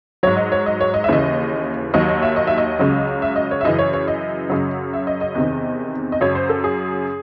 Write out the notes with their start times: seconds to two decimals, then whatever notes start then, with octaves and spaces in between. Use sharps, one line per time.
0.23 G#2 F#3 C#5
0.37 D#5
0.52 C#5
0.66 D#5
0.81 C#5
0.94 D#5
1.04 E5
1.09 D#2 C#3 E3 D#5
1.94 D#2 D#3 F#3 D#5
2.09 D#5
2.22 E5
2.36 D#5
2.47 E5
2.58 D#5
2.79 C#2 C#3 F#3
3.22 E5
3.36 D#5
3.51 C#5
3.61 E5
3.65 F#2 C#3 E3 D#5
3.79 C#5
3.94 C#5
4.08 D#5
4.50 F#2 C#3 F#3
4.93 E5
5.07 D#5
5.21 D#5
5.35 E2 C3 D#3
6.12 D#5
6.21 F#2 C#3 F#3 C#5
6.35 C5
6.49 A4
6.64 G#4